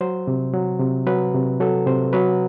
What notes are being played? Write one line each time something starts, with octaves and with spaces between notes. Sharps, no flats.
F#3 C5
C3
F#3
C3
F#3 B4
C3
F#3 A4
C3 C5
F#3 B4